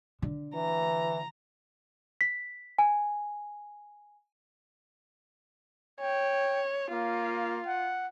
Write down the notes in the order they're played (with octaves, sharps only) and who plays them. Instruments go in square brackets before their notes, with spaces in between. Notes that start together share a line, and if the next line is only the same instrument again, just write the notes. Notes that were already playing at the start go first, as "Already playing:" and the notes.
[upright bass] D3
[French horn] E3 [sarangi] A#5
[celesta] B6
G#5
[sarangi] C#5 [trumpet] G5
[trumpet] A#3 [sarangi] F4
[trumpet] F#5